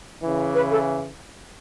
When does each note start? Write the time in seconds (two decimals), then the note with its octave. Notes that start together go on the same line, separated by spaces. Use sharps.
0.23 C#3 E3
0.55 B4
0.71 A4